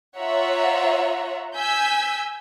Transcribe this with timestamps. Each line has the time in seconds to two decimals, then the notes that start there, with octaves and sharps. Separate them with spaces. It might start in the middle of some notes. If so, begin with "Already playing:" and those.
0.18 F4 C#5 E5 F#5 A#5
1.56 G#5 E6 G6 B6